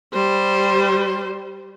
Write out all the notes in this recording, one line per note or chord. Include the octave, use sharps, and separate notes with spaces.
G3 C5